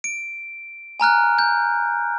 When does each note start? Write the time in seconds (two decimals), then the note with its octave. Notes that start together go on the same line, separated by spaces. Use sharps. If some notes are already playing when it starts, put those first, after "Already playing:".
0.04 D7
1.00 G#5 A#5 F6 F#6
1.39 G6